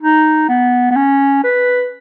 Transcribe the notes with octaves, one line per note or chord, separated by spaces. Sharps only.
D#4
B3
B3
C#4
B4